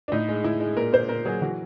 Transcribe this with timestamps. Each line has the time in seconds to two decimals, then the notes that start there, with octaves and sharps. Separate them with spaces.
0.08 D4
0.12 A2 D#4
0.28 G#3
0.44 A2 E4
0.60 G#3
0.77 A#2 A#4
0.93 A#2 C5
1.09 A#2 A#4
1.25 F#3 G#4
1.41 E3 F#4